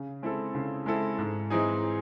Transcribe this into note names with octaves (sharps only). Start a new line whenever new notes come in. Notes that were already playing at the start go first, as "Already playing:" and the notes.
Already playing: C#3
G#3 C4 E4 A4
C#3
G#3 C4 E4 A4
G#2
E3 C4 D#4 G#4